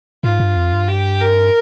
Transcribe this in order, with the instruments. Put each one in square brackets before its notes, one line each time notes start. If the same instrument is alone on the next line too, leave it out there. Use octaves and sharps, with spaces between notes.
[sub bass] G#2 [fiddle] F4
[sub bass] G2
F2
G2
[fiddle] G4
A#4